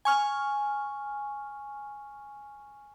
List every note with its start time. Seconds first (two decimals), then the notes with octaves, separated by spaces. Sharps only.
0.05 G#5 C#6 F6